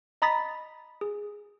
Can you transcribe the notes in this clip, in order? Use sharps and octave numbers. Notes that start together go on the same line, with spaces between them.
D#5 A#5 B5 D#6 A6 B6
G#4